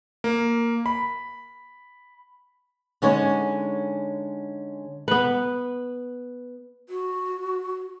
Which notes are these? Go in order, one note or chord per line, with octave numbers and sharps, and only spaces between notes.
A#3
B5
D3 G#3 C#4 D#4 C#5
B3 B4
F#4